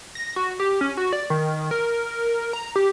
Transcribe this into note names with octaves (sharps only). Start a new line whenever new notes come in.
A#6
F#4
G4
C#4
F#4
D5
D#3
A#4
A#5
G4